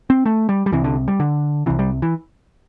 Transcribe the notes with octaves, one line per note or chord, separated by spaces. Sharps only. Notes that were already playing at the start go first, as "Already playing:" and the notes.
C4
A3
G3
G3
C2 C3 E3
D3
G3
D3
C2 C3 E3
G3
E3